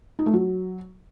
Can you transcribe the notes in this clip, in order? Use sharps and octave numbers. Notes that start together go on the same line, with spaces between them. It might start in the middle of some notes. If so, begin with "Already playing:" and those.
D#4
A3
F#3